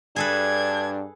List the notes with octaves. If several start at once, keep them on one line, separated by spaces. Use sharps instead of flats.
G2 D4 G#4 A4 B4 G#6